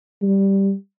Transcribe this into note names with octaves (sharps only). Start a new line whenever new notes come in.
G3